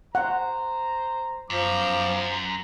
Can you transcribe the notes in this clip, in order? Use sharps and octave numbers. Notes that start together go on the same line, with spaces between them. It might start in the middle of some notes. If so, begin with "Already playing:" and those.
C5 F#5 A#5
F#2 F3 B3 D6